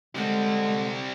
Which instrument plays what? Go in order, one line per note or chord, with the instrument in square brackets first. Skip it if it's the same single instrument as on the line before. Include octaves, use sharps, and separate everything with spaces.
[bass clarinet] D3 [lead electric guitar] G3 C4 [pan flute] G#3